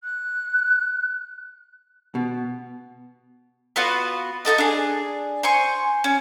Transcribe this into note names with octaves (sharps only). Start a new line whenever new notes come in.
F#6
B2
B3 F4 F#4 B4
D#4 F#4 A4 D#5
D4 G#4
C5 G#5 C#6
C#4